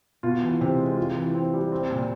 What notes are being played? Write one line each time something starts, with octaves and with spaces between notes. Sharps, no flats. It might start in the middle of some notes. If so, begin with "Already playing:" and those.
B2 F4
E3
C3 C4
G#3
F4
E3
C4
G3
C4
A#2